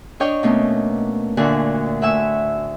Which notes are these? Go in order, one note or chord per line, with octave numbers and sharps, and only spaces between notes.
D4 C#5 D#5 G5 F6
B2 A3 A#3 C#4
D2 A#2 D3 F#4 G#5 F#6
A2 E5 F#5 G#5 E6